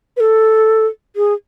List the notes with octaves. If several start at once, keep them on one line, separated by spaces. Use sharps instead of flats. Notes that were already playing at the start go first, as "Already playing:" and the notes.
B4
A4
G#4